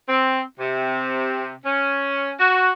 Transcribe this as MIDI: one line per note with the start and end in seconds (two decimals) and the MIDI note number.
0.08 0.41 60
0.59 1.53 48
1.64 2.31 61
2.39 2.72 66